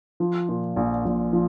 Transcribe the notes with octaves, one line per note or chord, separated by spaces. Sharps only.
F3
A#2
A#1
A#1
F3